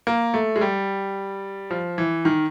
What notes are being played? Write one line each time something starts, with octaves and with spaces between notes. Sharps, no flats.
A#3
A3
G#3
G3
F3
E3
D#3